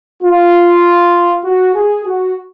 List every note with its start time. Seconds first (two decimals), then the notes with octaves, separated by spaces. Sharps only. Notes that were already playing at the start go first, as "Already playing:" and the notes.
0.23 F4
1.45 F#4
1.75 G#4
2.06 F#4